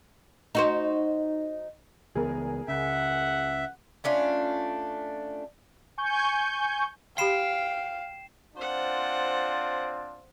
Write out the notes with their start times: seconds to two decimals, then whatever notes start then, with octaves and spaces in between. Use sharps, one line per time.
0.55 D#4 F#4 C5
2.15 C#2 E3 B3 G#4 A#4
2.68 C#2 C#3 E5 F#5
4.04 A3 C#4 D4 F4
5.98 G#5 C#6 G6
7.18 G4 F5 G5 B5 C6 C7 E7
8.57 C4 D4 F4 C5 F#5